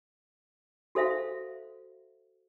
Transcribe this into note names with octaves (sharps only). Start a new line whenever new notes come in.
F#4 A4 C5 E5 F5